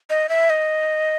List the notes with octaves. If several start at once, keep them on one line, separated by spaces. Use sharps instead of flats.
D#5
E5
D#5